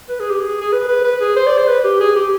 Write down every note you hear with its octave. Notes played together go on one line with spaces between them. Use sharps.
B4
G#4
G4
G#4
G#4
B4
B4
B4
G#4
C5
D5
C5
B4
G4
G#4
G4